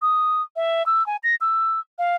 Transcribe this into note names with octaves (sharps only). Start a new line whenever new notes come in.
D#6
E5
E6
G#5
A#6
E6
F5